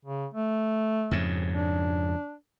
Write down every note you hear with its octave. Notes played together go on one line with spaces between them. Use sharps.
C#3
A3
F2 G#2 C#3
D4